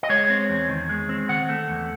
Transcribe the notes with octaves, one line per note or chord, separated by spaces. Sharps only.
D#5
G#3 C#5
C4
E2
D#3
G#3
C4
D#3 F#5
A3
E2